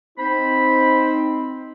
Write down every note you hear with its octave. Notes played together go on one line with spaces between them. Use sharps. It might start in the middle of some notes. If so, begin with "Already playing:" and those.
C4 D#4 C5 B5